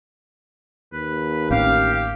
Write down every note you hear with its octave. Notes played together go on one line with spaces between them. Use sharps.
D#2 B4
A1 C4 C#4 G4 F5